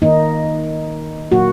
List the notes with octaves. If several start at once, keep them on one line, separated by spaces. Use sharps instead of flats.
D#3 A#3 D#4
A#2 F#3 A#3 F#4